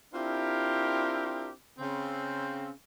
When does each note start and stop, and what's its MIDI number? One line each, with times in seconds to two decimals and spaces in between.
0.14 1.50 60
0.14 1.50 62
0.14 1.50 64
0.14 1.50 65
0.14 1.50 67
0.14 1.50 70
1.79 2.70 49
1.79 2.70 60